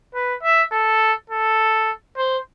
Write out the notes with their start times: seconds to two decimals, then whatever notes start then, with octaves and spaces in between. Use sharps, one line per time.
0.14 B4
0.43 E5
0.72 A4
1.30 A4
2.17 C5